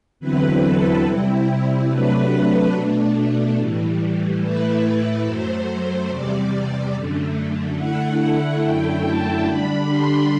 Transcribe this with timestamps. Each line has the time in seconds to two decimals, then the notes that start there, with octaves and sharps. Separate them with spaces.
0.20 E2 D3 F#3 C4 E4 B4
0.62 A4
1.04 C3 G3 C4 E4
1.88 C3 F#3 A3 D4 B4
2.30 B4
2.72 B2 A3 D4
3.57 A2 E3 G3
4.40 A2 E3 A3 E4 B4
5.25 F#2 F#3 A3 C5
6.09 E2 C3 G3 D5
6.94 F#2 D3 A3
7.77 D3 A3 E4 F#5
8.62 F#2 D3 A3 E4 G5
9.05 A5
9.46 D3 G3 D4 B5
9.88 C6